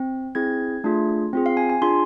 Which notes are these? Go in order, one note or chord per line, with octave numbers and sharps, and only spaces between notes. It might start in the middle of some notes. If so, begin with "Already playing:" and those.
Already playing: C4
C4 E4 G#4 G#6
A3 D4 F4 G#4
C4 F4 G#4
F5
G#5
G#5
D4 F4 G#4 C6